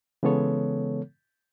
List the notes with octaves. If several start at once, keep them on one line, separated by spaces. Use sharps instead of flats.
C#3 E3 G#3 B3 A4 C#5